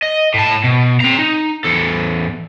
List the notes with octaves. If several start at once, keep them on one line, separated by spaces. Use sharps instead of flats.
D#5
A2 A5
B2
C4 A#5
D#4
E2 A4